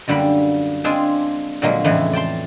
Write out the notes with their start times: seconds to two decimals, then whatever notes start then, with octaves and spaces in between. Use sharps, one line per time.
0.08 F#2 D3 G3 A#3 B5
0.84 G#3 C4 D4 F4 G#4
1.62 A#2 D3 F3 F#3 G#3 A#3
1.84 F2 A2 C#3 E3 G#3 G#4
2.13 D5 G5 A5 C6